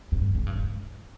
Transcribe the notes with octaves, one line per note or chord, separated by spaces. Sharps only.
G2
E2
G#2
G2
G#2